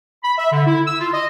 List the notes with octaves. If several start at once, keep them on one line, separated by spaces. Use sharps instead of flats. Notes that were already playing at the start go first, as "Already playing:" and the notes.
B5
E5
D3
E4
E6
F4
D#5